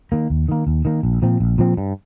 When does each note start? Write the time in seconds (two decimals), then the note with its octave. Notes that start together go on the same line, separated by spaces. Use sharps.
0.12 D#3 A#3
0.30 D#2
0.48 D#3 A#3
0.67 D#2
0.85 D#3 A#3
1.03 A#1
1.22 A#2 F3 C4
1.40 A#1
1.58 A#2 F3 C4
1.77 G2